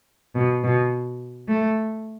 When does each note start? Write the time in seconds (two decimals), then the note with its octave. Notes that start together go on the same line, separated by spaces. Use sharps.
0.35 B2
0.64 B2
1.48 A3